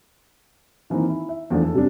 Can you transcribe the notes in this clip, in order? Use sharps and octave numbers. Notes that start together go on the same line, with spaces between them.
D#3 E3 A#3 C4 D#4
E4
E5
E2 F3 A3 D4
A4
C3 G3 C#4 D4